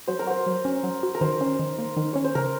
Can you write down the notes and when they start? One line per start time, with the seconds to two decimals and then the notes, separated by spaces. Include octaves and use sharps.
0.08 F#3 C5
0.19 A#4
0.27 F#4 C5
0.47 F#3
0.65 C#4
0.83 F#3
1.03 F#4
1.15 A#4
1.21 D#3 C5
1.41 C#4
1.59 D#3
1.79 A#3
1.97 D#3
2.13 C#4 C#5
2.24 C5
2.35 C#3 A#4